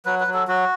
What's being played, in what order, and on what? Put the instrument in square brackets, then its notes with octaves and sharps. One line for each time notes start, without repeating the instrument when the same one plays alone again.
[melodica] F#3 B4
B4
F#3
A4
F#3 F#4